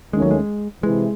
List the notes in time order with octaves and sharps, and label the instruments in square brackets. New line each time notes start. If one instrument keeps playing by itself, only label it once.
[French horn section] D#2 D#3 A3 C#4 [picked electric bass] G#3
[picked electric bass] F#3
G#3
[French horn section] C3 E3 [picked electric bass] G#3